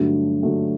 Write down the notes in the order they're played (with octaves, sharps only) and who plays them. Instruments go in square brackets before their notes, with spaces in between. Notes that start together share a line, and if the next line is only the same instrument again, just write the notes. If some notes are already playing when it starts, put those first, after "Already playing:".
Already playing: [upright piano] G2 D3 F#3 A3
G2 D3 F#3 A3